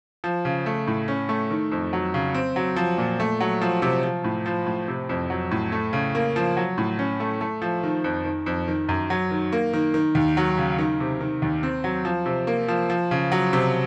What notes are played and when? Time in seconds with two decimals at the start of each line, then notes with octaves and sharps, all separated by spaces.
0.24 F3
0.45 C#3
0.66 A3
0.87 A2
1.08 C#4
1.29 A3
1.51 D#3
1.71 F2
1.93 F#3
2.14 C#3
2.34 C4
2.56 F#3
2.76 F3
2.98 A#2
3.20 A3
3.40 F#3
3.61 F3
3.82 C3
4.03 F3
4.24 A2
4.46 F3
4.67 A2
4.88 C3
5.09 F2
5.30 F#3
5.51 A2
5.72 A3
5.93 C#3
6.15 A#3
6.36 F3
6.57 F#3
6.78 A2
6.99 C#4
7.20 A3
7.41 A3
7.62 F3
7.83 D#3
8.04 F2
8.25 D#3
8.46 F2
8.68 D#3
8.89 F#2
9.10 F#3
9.31 D#3
9.52 A#3
9.73 D#3
9.94 D#3
10.15 D#2
10.37 F#3
10.57 C#3
10.79 D#3
11.00 C3
11.21 D#3
11.42 D#2
11.63 C4
11.84 F#3
12.05 F3
12.26 C3
12.47 A#3
12.68 F3
12.90 F3
13.11 C#3
13.32 F#3
13.53 C3